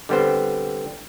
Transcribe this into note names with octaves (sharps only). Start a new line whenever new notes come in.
D3 G3 B3 C4 C5